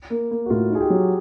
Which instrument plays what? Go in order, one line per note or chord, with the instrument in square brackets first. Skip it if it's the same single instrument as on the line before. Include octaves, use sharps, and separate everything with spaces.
[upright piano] A#3
A#3
[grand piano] F#4
[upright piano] A2 [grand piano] F4
[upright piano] D#4 [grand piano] G#4
[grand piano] G4
[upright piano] F#3